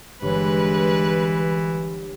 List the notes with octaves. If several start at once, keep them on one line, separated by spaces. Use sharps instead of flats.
G1 E3 G#3 B4 C#5 F#5